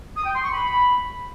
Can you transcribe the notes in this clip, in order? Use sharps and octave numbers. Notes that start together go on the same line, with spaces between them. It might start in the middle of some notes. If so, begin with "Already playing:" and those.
D#6
G5
C6
C#6
B5